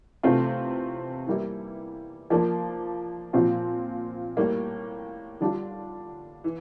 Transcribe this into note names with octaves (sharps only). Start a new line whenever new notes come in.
C3 E3 A3 C4 F4
E3 G3 A#3 E4
F3 A#3 D4
A#2 F3 C4 F4
A2 G3 A#3
D3 G3 D4 F4
E3